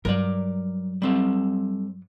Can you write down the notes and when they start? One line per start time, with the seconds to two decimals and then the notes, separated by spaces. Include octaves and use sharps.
0.05 G2 F#3 A#4 D5
1.02 G3 C4 A4